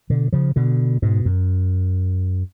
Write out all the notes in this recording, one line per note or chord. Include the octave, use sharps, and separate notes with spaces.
B2 D3
C#3 F3
B2 D3
G#2 B2
F#2